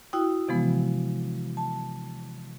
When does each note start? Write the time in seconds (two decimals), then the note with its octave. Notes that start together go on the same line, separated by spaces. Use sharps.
0.13 E4 F#4 G5 D#6
0.48 C3 E3 F3 G#3 B3
1.57 A5